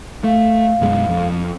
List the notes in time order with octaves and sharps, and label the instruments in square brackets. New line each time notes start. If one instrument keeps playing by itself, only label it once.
[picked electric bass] A3 [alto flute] F5
[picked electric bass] F#2 B2 G#3
F2